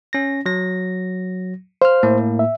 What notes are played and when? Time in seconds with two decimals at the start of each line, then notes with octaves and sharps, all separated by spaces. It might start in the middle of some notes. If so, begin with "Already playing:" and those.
0.13 C#4 A#6
0.46 F#3 A#6
1.82 C5 F5 F6
2.03 A2 A#3
2.39 E5